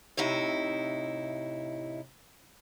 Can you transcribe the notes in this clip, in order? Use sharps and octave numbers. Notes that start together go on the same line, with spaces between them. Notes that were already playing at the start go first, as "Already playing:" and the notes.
A2 C3 D#4 E4